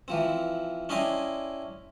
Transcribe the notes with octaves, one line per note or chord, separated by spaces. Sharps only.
E3 F3 C4
C#4 D4 E4 D#5 G5 C6